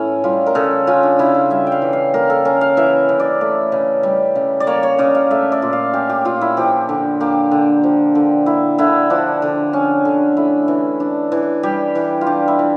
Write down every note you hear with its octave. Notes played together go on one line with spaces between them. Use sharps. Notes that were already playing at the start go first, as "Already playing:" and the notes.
Already playing: A2 E3 A3 C#4 E4
G3 F4
A#4
C#3 A4
C#4 F4
D4
C#3 E4
F4
G3 E5
G5
F5
E3
F5
A#3 A#4
A4
C#4 A#4
F5
E3 E5
C#3
D5
A3
C#3
G3
C#3
D5
A#3 C#5
C#5
C#3 D5
F5
A3 E5
D5
A#2
F5
C#4 G4
G4
A#2 F4
E4
F3 G4
D3
A#3 G4
D3
F3
D3
A#3 E4
D3 E4
F3 D4
D3
C#4
D3
A3 E4
E3
D4
E3
G3 G4
E3
F4
D4 G4
E4
E3